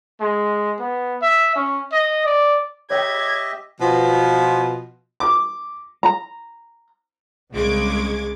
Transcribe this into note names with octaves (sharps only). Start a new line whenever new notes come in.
G#3
B3
E5
C#4
D#5
D5
G4 C#5 D#5 E5 G5 G#6
B2 F3 B3 F4
D6
A#5
C2 C#3 G#3 D6 G#6